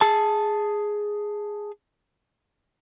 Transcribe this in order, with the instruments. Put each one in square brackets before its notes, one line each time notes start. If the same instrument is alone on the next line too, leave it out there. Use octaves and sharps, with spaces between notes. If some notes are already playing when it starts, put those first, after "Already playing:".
[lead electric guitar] G#4 A5